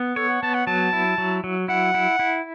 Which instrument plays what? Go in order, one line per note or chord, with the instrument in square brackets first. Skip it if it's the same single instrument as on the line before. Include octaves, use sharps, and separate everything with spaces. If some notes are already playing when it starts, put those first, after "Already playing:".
Already playing: [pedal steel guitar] B3
[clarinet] A4 [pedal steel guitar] C#5
[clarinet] F#5
[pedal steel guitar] B3 [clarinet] A5
[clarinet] F#5
[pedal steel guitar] F#3 [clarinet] A5
[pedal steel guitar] E4
F#3
F#3
[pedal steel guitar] E4 [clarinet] F#5
[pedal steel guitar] E4
E4